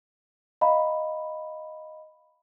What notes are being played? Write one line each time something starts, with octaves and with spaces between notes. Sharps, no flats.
D#5 F5 A#5 B5